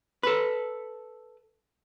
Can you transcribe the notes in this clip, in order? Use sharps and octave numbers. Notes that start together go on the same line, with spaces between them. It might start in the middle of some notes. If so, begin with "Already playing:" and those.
A4 B4